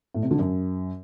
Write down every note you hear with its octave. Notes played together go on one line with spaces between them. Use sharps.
A2
C3
D3
F#2